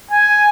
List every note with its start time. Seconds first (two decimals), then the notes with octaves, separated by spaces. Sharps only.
0.11 G#5